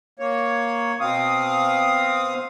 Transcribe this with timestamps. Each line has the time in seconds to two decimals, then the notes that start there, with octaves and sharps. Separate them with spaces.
0.19 A#3 C#5
1.00 B2 C4 F5 D#6